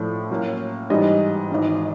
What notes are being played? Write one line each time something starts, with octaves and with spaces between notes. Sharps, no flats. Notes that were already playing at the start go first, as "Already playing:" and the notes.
Already playing: A2 F3 A3 D4
A2 F#3 A#3 C#4
G#2 E3 G3 D#5
G#1 G#2 E3